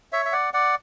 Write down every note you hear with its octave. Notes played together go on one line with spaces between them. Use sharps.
C#5 E5
E5
D5 F#5
D5 F#5